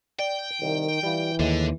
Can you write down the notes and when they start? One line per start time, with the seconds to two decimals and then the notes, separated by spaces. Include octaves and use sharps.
0.19 D5 G5
0.62 C2 D#3
1.03 E3 G3 F4
1.39 D#2 A2 D3 G#3